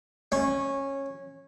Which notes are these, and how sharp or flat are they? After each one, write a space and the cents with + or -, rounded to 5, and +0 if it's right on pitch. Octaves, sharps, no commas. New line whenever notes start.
C#4 -15